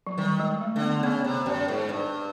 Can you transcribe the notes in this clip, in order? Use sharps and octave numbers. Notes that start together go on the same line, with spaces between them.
F#3
D#3 G3
G#3
A3
D3
B3
C#3 B3
C3
F#2
G#2
G2